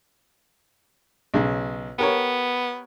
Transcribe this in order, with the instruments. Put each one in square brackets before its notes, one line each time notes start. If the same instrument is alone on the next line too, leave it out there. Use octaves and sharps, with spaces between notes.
[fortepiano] B1 C#3
[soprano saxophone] B3 [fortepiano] G4 A#4 C#5